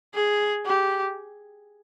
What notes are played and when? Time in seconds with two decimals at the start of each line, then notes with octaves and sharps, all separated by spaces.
0.14 G#4
0.66 G4